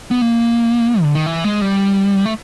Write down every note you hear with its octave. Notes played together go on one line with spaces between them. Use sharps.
B3
A#3
D3
D#3
E3
G#3
G3
A3